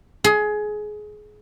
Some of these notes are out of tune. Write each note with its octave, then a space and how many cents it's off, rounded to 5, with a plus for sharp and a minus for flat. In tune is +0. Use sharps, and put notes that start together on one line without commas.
G#4 +20